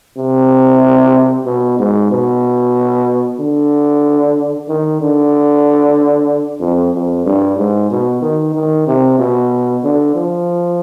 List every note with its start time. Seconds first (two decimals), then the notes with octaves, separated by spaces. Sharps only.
0.17 C3
1.45 B2
1.79 G#2
2.11 B2
3.40 D3
4.68 D#3
5.01 D3
6.61 F2
6.93 F2
7.25 G2
7.57 G#2
7.90 B2
8.22 D#3
8.54 D#3
8.87 C3
9.19 B2
9.83 D3
10.15 F3